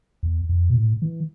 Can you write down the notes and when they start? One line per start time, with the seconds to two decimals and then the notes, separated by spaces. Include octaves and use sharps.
0.23 E2
0.49 F2
0.70 B2
0.75 A2
1.02 E3